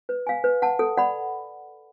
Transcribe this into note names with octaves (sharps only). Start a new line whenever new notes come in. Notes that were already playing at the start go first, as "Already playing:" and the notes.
B4
F5 G#5
B4
F#5 A5
A4
D5 F#5 B5